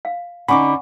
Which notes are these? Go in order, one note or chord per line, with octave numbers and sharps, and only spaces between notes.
F5
D3 C#4 D#4 F#5 G#5 B5 C#6 D6